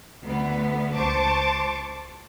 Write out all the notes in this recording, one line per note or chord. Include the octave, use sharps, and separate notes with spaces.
D2 B3
C#2 C5 A5 C#6 D6